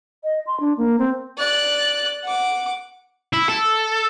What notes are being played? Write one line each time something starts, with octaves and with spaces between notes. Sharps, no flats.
D#5
C6
D4
A#3
C4
D5 F#6
F#5 D6
E4
A4